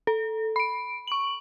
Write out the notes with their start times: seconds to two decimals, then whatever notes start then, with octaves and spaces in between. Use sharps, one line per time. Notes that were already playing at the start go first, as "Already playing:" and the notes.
0.07 A4
0.56 B5 D7
1.07 C#6 F#7